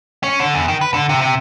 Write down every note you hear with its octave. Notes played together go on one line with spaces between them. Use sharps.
C#4
D3
E2
D#3
B4
D3
C3
C3